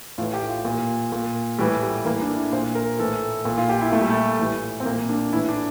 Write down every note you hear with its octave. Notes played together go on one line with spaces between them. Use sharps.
A2 E3 F4
G4
F4
A#2
A#2
A2 E3 G3
G3
A2 E3 A#3
D4
E4
A#2 C5
A#4
A2 E3 A4
A#2
F4
G4
E4
A#2 A3
G3
A3
A2 E3
C4
A#2 A#3
D4
A2 E3 E4
D4